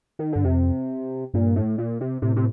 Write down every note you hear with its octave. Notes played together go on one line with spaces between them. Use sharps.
D#3
G2 D3
F2 C3
G2 A#2
A2
A#2
C3
A2 C3
C3